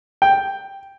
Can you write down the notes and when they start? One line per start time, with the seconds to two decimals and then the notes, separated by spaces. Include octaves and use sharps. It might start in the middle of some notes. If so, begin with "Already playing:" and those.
0.22 G5